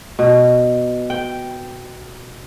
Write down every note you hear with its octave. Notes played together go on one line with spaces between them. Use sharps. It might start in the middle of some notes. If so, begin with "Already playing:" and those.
B2
G5